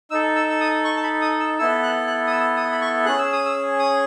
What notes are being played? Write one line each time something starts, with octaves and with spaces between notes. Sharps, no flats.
D#4 A4 E6
E6
E6
D#6
C#6
A5
B5
D#6
E6
B3 E4 A4 E6
F#6
F#6
D#6
E6
D#6
B5
C#6
C#4 G#4 F#6
E6
D#6
E6
D#6